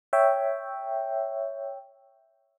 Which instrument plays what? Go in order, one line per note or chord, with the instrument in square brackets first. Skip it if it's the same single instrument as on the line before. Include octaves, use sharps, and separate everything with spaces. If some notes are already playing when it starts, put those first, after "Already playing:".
[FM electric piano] C#5 E5 G5